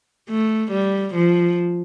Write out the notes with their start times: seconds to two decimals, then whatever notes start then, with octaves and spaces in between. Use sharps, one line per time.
0.29 A3
0.71 G3
1.14 F3